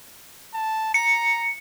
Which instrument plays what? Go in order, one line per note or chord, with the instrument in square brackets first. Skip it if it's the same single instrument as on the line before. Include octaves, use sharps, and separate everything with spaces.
[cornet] A5
[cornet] A#5 [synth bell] C#7